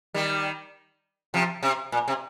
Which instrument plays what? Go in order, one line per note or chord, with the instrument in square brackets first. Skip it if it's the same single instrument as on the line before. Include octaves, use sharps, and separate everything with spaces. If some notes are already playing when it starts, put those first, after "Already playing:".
[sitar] D#3 G3
C3 F3
C3
A#2
C3